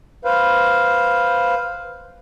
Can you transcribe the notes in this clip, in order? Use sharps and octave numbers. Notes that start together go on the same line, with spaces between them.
B4 C5 F5